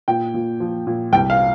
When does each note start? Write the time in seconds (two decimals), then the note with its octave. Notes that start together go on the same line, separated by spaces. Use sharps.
0.08 A#2 G5
0.34 A#2
0.60 F3
0.87 A#2
1.12 C2 G5
1.30 F5